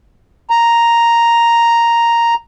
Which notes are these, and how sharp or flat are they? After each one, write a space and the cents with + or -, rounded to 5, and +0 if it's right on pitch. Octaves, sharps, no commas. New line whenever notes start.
A#5 +0